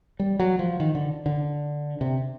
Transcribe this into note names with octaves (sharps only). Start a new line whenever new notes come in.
G3
F#3
F3
D#3
D3
D3
C3